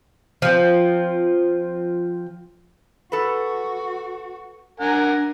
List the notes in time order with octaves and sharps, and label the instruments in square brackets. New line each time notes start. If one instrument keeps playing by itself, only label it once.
[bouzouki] F3 C4
[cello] F#4 [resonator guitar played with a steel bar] A4 B4
[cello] D4 [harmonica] A#4 F#5 G#5